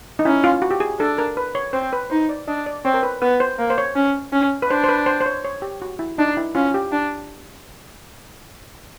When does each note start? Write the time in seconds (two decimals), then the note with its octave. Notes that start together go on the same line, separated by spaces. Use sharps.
0.19 D#4
0.25 C#4 E4
0.44 F4
0.62 F#4
0.71 G4
0.80 G#4
0.99 D4 A4
1.18 A#4
1.37 B4
1.55 C#5
1.73 C4 C5
1.93 B4
2.10 D#4 C5
2.29 D5
2.48 D4 D#5
2.66 D5
2.85 C4 C#5
2.94 A#4
3.03 B4
3.22 B3 B4
3.40 C5
3.59 A#3
3.70 C5
3.78 C#5
3.96 C#4
4.33 C#4
4.62 B4
4.70 D4 C5
4.84 C5
4.89 B4
5.06 C5
5.21 C5
5.26 C#5
5.45 C#5
5.62 G4
5.82 F#4
5.99 E4
6.18 D4 D#4
6.37 E4
6.55 C#4 F4
6.74 G4
6.92 D4